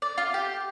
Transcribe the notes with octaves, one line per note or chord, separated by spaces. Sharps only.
D5
F4
G4